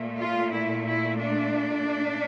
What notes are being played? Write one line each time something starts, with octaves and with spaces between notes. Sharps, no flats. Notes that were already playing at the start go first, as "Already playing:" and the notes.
Already playing: A#2 A3
F4
E4
E4
D4